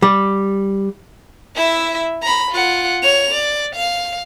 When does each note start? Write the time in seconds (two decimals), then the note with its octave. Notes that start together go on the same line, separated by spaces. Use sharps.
0.02 G3
1.55 E4 E5
2.22 A#5 B5
2.51 F4 F#5
3.02 C#5 F7
3.34 D5
3.75 F5